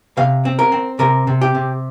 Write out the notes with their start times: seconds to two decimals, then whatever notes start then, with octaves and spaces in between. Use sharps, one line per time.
0.17 C3 F5
0.45 C4
0.59 A#4
0.72 C4
0.99 C3 A#4
1.27 C3
1.41 G4
1.55 C3